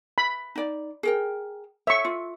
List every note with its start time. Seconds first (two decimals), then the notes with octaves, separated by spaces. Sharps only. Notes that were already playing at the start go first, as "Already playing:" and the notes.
0.18 B5
0.56 D#4 D5
1.03 G#4 A#4 G5
1.87 C#5 E5 C#6
2.05 F4